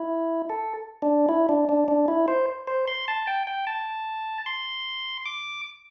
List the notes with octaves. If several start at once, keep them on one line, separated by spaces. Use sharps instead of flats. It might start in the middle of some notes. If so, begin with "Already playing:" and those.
Already playing: E4
A4
D4
E4
D4
D4
D4
E4
C5
C5
C6
A5
G5
G5
A5
C6
D6